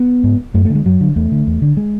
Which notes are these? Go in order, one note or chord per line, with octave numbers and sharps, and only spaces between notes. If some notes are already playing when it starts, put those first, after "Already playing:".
Already playing: B3
G#2
F#2 A3
A3
D3
G#3
F#2 F#3
D3
E2 A3
D3
E2
D3
G#3